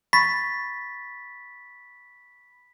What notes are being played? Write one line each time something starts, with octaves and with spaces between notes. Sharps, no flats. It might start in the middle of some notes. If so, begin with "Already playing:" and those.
B5 C#6 A6 B6